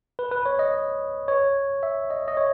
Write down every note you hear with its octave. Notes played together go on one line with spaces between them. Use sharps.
B4
B4
C#5
D#5
C#5
E5
D#5
D#5
C#5